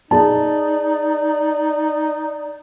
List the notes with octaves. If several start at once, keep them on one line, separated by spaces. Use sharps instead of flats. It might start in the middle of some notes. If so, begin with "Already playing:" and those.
D#4 G#4 D5 A5